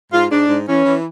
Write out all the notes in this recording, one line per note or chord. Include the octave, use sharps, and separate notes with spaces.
G#2 F4
G#2 D4
G#2
E3 C#4
E3